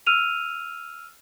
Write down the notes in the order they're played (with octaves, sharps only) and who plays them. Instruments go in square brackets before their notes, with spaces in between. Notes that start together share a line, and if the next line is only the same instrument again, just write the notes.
[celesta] E6 F6 D#7 F7